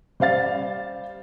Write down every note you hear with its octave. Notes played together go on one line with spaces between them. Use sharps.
G3 C5 F5 A6